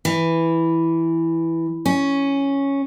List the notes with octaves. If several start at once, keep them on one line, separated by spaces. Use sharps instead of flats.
E3
C#4